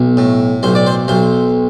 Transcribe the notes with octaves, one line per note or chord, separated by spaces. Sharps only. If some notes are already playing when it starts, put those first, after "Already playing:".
Already playing: B1
A2
B1 C5
D5
C5
B1 C5